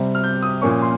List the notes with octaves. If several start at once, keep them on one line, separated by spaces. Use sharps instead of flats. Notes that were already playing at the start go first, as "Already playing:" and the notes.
Already playing: C3 G3 C4
F6
G6
D#6
A#2 F3 A#3 C#4 C#6
C6